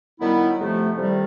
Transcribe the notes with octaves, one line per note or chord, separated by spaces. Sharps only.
F#2 D#3 G3 B3 E4
F2 C3 F3 A3
F2 C3 D#3 G3